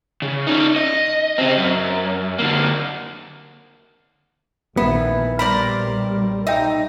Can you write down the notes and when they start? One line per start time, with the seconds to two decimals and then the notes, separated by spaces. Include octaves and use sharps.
0.22 C#3
0.47 C#4 D#4
0.76 D#5
1.38 C#3 C4
1.57 F#2
2.38 D3 A#3
4.77 A#1 D#3 E3 B3
5.39 B1 A#2 G3 A#4 C5 D5 B5
6.47 D#4 E5 G5